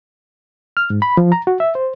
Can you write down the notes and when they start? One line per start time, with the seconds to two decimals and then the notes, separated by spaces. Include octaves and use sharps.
0.77 F6
0.90 G#2
1.02 B5
1.17 F3
1.32 A#5
1.47 F#4
1.60 E5
1.75 C5